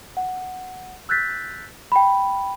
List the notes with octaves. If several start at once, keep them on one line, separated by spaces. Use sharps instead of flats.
F#5
E6 F#6 G6 A6 B6
G5 B5